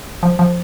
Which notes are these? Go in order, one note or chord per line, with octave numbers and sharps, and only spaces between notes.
F3
F3